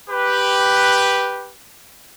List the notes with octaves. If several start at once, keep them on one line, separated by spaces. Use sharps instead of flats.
G4 B4